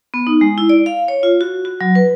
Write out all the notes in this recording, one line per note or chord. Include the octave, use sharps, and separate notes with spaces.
B3
D#4
G#3
E4
D5
F5
C#5
F4
F#4
F#4
F#3
B4